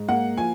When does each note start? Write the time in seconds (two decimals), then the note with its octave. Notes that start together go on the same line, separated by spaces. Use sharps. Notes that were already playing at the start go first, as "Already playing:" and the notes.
Already playing: G#2
0.09 A#3 F#5
0.38 F3 G#5